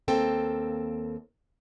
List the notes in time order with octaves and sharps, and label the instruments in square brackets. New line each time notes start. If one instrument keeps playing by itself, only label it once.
[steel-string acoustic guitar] D#2 A#3 C4 A4 G5